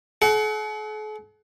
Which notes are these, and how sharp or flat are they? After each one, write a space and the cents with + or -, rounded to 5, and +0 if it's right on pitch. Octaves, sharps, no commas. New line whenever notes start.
A4 -45 F#5 +25